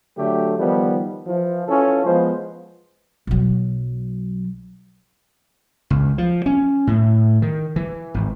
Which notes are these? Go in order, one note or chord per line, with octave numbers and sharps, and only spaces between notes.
D3 F#3 A3 G4
D#3 F3 G3 B3
E3 F3
E3 C#4 F4 A4
F3 G#3 B3 C5
B1 F#3
C#2
F3
C#4
A2
D#3
E3
G#1